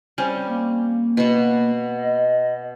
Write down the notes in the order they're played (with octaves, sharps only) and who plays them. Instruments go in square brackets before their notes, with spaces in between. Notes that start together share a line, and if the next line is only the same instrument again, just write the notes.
[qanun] G3 C4 C#4 [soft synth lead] G#5
[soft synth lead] A#3
[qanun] B2 F#4
[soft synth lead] D#5